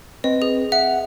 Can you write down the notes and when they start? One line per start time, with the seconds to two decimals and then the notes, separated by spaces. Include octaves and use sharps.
0.24 C4 B4 D#5
0.42 G#4
0.72 E5 F#5